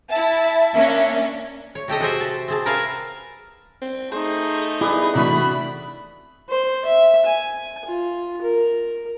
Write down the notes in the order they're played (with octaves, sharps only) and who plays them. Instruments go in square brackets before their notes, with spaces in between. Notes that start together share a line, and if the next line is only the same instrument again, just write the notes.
[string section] E4 A5 [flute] E5
[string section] A#3 C#4 D4
[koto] C#5
C3 G4 A4 D#5
F#4 G#4 C5 E5
A5
C4 G#4 A5
A#4 B4 E5 F5 G#5 A5
[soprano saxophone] C4
[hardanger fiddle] A3 D#4 [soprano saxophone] G#4 [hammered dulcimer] C5
[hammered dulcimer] G3 B3 [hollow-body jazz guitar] E4 [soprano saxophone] G#4
[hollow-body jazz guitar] C3 E3 A3 [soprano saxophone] D4 [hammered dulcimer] E4 F#4 B4 [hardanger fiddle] B5
[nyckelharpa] C5
E5
G#5
F4
A#4